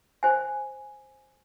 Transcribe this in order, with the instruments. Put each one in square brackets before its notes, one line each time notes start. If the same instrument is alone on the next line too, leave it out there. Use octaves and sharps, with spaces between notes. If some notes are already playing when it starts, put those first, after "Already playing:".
[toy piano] C5 G#5